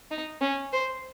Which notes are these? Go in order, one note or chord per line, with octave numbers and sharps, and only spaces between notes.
D#4
C#4
C5